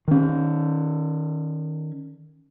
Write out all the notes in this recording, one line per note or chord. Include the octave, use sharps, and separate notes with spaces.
D#3 C#4